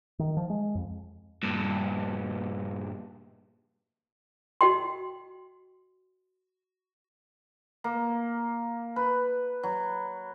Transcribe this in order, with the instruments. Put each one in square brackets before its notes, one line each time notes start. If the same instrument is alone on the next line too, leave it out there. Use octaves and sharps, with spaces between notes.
[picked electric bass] D#3
F3
G#3
F2
[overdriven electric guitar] G2 A#2
[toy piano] F#4 D#5 G5 C6
[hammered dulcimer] A#3
B4
F#3